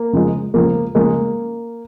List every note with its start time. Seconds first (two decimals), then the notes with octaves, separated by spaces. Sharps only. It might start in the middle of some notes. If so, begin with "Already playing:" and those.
Already playing: A#3
0.13 C#3 F3 G#3
0.54 C#3 F3 G#3 A#3
0.95 C#3 F3 G#3 A#3